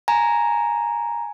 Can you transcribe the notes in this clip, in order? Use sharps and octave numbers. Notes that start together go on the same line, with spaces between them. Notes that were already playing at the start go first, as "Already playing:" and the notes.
G#5 A#5